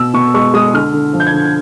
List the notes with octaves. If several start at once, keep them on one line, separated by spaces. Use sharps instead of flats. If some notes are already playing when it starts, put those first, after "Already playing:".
Already playing: B2 E6
B2 C#6
G#3 C#6
G#3 D#6
D3 F6
D3
F3
G6
G#6
D3